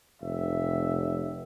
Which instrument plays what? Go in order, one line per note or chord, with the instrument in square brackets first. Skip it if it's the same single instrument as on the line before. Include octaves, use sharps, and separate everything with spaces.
[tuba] F1 [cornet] E5